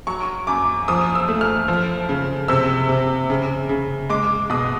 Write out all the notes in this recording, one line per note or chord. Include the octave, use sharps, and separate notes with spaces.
F#3 C#6
F#2 D6
F3 D#6
E6
A3
F6
F3
C#3
C3 E6
C3
C#3
C#3
G#3 D6
B2 D#6